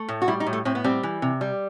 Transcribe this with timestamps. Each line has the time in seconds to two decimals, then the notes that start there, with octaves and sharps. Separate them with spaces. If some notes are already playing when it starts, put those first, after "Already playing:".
Already playing: A3
0.09 A2
0.22 F#4
0.28 G3 E4
0.40 D#4
0.46 A2
0.53 A3
0.65 A2 C4
0.75 B3
0.84 G3 C4
1.03 E3
1.22 C3
1.41 G3